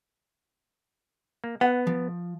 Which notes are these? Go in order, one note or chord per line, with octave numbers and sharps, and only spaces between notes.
A#3
B3 F#5
F3